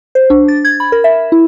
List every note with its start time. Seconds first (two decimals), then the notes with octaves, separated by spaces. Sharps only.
0.15 C5
0.30 D4
0.48 A6
0.65 G#6
0.80 B5
0.92 A#4
1.04 E5
1.32 E4